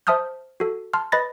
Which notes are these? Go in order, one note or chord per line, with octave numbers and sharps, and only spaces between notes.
C5 E5 A5 D#6 F6 G6
F#4 A4
A5 C6 F6
B4 D#5 B5 A6 A#6